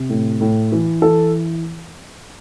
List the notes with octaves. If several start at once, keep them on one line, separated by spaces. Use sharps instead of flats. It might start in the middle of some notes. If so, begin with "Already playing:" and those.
Already playing: C3
A2
A2
E3
E3 A4